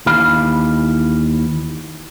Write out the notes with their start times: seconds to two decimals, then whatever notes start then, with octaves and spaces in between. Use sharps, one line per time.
0.06 D#2 E3 F5 B5